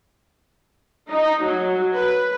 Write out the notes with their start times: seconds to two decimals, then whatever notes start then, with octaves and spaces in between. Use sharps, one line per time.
1.10 D#4
1.43 F#3
1.94 B4